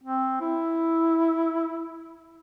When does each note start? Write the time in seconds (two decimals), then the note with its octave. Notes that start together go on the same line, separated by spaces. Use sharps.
0.03 C4
0.41 E4